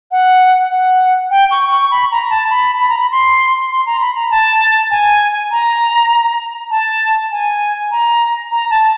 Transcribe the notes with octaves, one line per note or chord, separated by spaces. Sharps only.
F#5
F#5
G5
C#6
C#6
B5
A#5
A5
B5
B5
A#5
B5
C6
C6
A#5
B5
A#5
A5
G#5
A#5
A5
G#5
A#5
A#5
A5